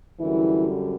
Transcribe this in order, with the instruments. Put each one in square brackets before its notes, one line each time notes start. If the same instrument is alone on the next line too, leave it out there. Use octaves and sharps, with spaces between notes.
[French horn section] F#2 D3 E3 G3 E4